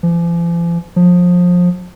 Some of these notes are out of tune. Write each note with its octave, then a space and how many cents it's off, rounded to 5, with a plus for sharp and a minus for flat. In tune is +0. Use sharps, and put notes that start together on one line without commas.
F3 -45
F3 +25